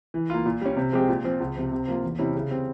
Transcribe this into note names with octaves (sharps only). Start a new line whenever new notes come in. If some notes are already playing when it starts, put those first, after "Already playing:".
E3
A#3 F4
A#2
G3 C#4
C3
F3 G#3 C4 G4
A#2
F3 C4
C#2
C3 F3
C3
F3 A#3 F4
E2
C3 G3 C#4 E4
C#3
G3 C4